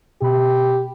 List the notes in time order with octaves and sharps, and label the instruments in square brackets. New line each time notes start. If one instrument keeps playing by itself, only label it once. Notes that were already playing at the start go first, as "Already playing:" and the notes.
[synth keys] B2 B5 [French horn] G4